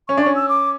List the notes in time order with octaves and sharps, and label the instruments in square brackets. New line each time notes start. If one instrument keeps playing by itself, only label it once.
[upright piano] C#4 [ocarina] C#6
[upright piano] D4
[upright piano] C#4 [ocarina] C#6
[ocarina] E6
D6